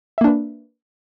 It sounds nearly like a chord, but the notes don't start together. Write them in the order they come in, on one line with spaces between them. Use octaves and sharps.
E5 A#3 D4 B4